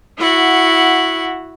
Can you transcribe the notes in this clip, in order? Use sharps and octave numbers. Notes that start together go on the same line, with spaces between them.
E4 F#4 F#5